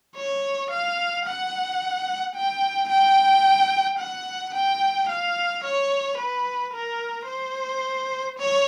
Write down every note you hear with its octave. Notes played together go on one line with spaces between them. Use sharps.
C#5
F5
F#5
G5
G5
F#5
G5
F5
C#5
B4
A#4
C5
C#5